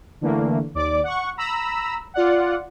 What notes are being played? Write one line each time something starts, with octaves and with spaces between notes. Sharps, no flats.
D3 E3 A3 A#3
D#2 D5 D6
F#5 C#6
A#5 B5 E6
F4 D5 F#5